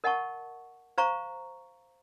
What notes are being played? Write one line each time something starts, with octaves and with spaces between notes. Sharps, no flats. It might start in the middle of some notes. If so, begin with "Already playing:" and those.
A#4 D#5 F#5 A5 C#6
C5 F5 A#5 C#6